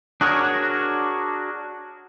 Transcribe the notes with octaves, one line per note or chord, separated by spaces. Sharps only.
D4 F#4 G#4 A#4 C#5